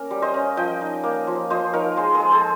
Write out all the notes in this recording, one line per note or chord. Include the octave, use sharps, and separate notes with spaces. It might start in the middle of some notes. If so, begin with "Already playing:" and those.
Already playing: A#3 C#4 A#4
G3
C5 D#5
C#4
F3 D#5 G5
D#4
A#3
F3
F3 C5 D#5
D#4 A#4 C#5
G#3 G#4 C5
G#4 C5
G#3
G#4 C5